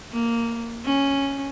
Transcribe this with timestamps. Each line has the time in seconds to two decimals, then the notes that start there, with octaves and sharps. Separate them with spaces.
0.12 A#3
0.85 C#4